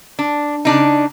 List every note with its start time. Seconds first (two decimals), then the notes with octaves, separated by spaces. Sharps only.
0.19 D4
0.65 C#3 D4 D#4